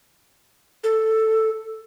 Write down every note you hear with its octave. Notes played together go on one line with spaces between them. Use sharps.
A4